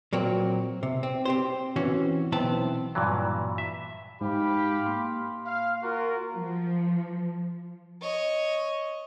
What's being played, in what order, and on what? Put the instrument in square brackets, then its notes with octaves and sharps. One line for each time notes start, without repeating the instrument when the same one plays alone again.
[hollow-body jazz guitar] A#2 F#3 A#3 C4
C3
C4
C4 G4 C5
E3 C4 C#4 F#4
B1 E3 B3 C4 A5
[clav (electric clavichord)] G2 A#2 E3 F#3
E5
[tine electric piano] G#2 [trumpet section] G4 F5 B5
[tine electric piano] A#3 C6
[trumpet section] F5
F4 F#4 A#4
[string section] F3
[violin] C#5 D#5